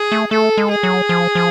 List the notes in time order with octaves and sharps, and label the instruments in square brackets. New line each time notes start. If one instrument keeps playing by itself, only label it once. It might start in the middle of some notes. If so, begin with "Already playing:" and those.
Already playing: [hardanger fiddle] G#4
[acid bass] A3
[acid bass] A3 [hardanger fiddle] A4
[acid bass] G#3
[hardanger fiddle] G#4
[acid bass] F#3
F3
F3